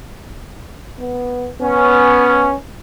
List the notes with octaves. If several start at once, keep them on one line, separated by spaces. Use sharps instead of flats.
B3
B3 C#4